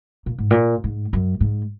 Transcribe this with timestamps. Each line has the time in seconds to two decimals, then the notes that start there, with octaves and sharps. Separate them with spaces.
0.26 A#2
0.38 G#2
0.51 A#2
0.84 G#2
1.13 F#2
1.40 G#2